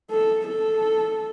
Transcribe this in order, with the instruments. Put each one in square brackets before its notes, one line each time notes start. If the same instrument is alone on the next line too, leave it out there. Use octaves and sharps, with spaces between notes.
[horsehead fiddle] A4
A4